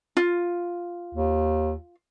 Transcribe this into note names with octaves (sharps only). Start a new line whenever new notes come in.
F4
D#2